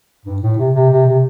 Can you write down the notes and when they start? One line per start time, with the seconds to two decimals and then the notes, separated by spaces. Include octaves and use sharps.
0.26 G2
0.42 A2
0.58 C3
0.74 C3
0.90 C3
1.06 C3